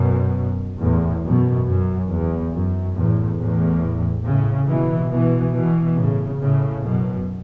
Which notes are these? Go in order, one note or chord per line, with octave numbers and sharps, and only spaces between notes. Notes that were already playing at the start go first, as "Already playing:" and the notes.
Already playing: F#2 B2
E2 A2
F#2 B2
F#2
E2
F#2
E2 A2
E2 A2
A2 C#3
B2 E3
B2 E3
B2 E3
A2 C#3
A2 C#3
F#2 B2